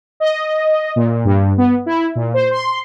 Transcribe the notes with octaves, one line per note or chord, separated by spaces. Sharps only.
D#5
A#2
G2
B3
E4
A#2
C5
C6